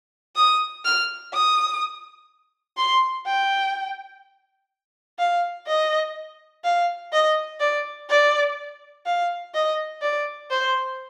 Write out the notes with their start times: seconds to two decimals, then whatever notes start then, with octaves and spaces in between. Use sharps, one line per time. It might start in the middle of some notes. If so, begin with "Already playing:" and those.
0.36 D#6
0.85 F6
1.34 D#6
2.77 C6
3.26 G5
5.19 F5
5.67 D#5
6.64 F5
7.13 D#5
7.60 D5
8.09 D5
9.06 F5
9.54 D#5
10.02 D5
10.51 C5